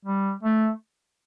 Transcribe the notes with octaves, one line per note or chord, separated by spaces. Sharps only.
G3
A3